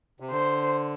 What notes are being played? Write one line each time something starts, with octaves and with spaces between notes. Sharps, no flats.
C3
D3 C5